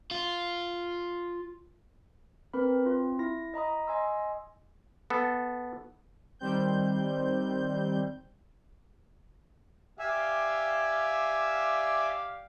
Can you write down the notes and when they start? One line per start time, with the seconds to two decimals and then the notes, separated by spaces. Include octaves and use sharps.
0.11 F4
2.54 C4 A#4 B4 B5
2.83 C4 F4
3.19 E4 A#6
3.54 D#5 A#5 B5 D#6
3.87 D#5 G#5 C6 E6
5.10 B3 A4
6.39 D#3 G3 C4 G6
9.99 G4 D5 E5 F5 G#5